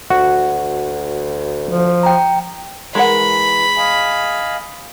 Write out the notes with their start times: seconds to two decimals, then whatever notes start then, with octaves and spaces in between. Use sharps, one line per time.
0.10 D2 F#4
1.68 F3
2.03 G5 A#5
2.95 E3 G#3 A#4 F#5 B5
3.77 D#5 F5 G#5